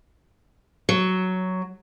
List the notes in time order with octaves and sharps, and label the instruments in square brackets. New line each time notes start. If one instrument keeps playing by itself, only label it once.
[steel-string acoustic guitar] F#3